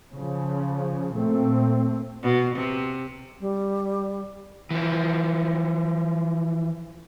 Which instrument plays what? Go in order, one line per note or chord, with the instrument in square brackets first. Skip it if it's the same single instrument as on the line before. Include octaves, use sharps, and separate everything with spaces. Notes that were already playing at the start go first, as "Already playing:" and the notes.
[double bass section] C#3 F3
A#2 A3 C4
[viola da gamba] B2
C3
[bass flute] G3
[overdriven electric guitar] E3 F3